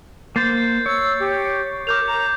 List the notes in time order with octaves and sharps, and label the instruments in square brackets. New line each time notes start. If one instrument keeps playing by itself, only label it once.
[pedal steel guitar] A#3 C5 C6 [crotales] G6 A6 C7
[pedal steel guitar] C#5 [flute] E6
[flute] G4
[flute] A#4 [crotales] D6 G6 F7
[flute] A#5